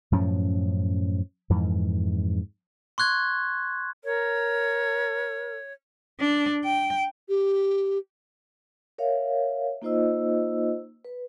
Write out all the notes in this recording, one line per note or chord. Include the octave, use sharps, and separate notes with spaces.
F#2 A2 F3 C#4
F2 G#2 E3
C6 C#6 F#6 G#6
A#4 C#5
D4
G5
G4
A#4 C#5 E5 F5
A#3 D#4 F4 C5 D#5 E6
B4